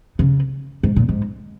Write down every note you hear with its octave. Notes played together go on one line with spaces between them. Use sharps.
C#3
G#2
A#2
G#2